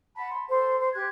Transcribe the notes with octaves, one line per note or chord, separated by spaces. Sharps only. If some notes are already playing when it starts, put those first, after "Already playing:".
F#5 A5 B5
C6
A4 C5
C5
G4 F#6 G#6